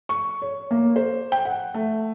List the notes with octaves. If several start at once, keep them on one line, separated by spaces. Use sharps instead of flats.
C#6
C#5
A#3
C5
G5
F#5
A3